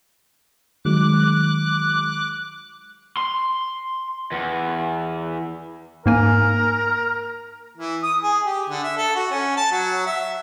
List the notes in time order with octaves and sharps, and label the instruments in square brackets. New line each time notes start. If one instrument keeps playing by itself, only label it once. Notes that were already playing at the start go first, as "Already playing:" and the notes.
[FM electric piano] D#3 F#3 G#3 [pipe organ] D6 F#6
[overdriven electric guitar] C6
E2
[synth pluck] G#2 A#3 G#5 [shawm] A#4
[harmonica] E3
D#6
G#4
G4
D3
E5
A4
F#4
C#4
A5
F#3
E5